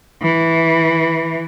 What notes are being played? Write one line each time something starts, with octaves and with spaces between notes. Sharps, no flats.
E3